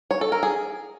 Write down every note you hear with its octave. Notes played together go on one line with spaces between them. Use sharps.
C#5
A4
A#4
G#4